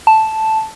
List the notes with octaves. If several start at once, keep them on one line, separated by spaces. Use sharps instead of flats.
A5